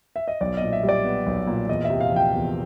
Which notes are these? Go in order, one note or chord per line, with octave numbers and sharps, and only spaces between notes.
E5
D#5
B1 D5
A#2 D#5
E5
G3
D5
B3
B1
A#2
E2 D#5
E5
C3
F5
F3
G5
E2